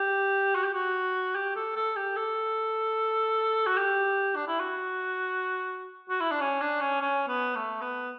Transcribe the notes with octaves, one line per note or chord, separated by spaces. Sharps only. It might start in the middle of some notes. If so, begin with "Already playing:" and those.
Already playing: G4
F#4
G4
F#4
G4
A4
A4
G4
A4
F#4
G4
D4
E4
F#4
F#4
E4
D4
C#4
D4
C#4
C#4
B3
A3
B3